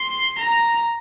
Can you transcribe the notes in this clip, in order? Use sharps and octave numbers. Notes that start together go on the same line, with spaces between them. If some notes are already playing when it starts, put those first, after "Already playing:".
Already playing: C6
A#5